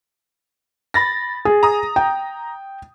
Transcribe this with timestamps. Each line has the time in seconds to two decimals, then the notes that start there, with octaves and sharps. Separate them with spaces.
0.94 B5 A6 A#6
1.45 G#4
1.63 A#5 D#6
1.96 G5